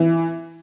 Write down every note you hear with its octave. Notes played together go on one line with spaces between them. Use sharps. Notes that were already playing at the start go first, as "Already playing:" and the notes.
Already playing: E3